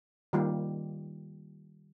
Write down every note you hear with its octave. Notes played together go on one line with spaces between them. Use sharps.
D#3 G3 A#3 F4 G4